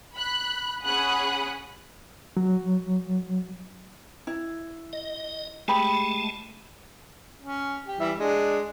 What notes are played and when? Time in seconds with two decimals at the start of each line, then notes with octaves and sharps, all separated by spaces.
0.14 B5 F#6
0.84 C#4 G#4 F#5 B5 D#6 F#6
2.37 F#3
4.27 E4
4.93 D#5
5.68 G#3 A3 G4 G#4 A5 B5
7.42 C#4
7.87 G4
8.00 E3 G3 E5
8.18 G#3 D4